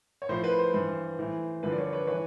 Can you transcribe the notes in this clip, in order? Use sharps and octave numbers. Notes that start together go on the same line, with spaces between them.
C#5
A2 F3 C5
B4
C5
G2 E3
A2 E3
G2 D3 F3 B4
D5
B4 C#5
B4 C#5
E3 B4 C#5